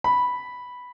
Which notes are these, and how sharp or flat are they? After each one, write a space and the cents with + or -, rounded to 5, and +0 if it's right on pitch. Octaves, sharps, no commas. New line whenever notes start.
B5 -5